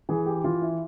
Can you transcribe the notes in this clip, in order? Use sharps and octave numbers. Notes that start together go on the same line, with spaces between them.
E3 G#4
G4
E3 F4
E4